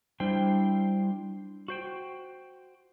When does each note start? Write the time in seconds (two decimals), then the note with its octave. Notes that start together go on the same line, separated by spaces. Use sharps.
0.20 G3 D4 E4 C5 G5
1.68 F#4 C5 G5